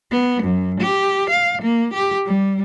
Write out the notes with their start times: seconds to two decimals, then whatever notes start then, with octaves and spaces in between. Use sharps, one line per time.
0.11 B3
0.43 F#2
0.81 G4
1.30 F5
1.62 A#3
1.94 G4
2.26 G3